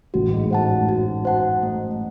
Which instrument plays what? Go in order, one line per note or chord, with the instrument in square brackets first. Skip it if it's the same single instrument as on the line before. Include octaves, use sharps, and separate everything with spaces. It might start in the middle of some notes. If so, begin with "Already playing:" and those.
[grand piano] A1 A2 [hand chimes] F#4
[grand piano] G#2 G#3
[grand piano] A2 A3 [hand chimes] C5 F#5 A5
[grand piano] F#2 F#3
[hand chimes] F#4
C5 F#5 A5
A3